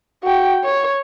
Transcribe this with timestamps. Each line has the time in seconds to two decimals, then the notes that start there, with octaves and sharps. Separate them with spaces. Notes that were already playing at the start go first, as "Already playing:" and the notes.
0.23 F#4 G5
0.64 C#5